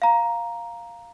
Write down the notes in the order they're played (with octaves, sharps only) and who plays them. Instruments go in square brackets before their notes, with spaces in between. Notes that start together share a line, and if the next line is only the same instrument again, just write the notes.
[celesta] F5 A#5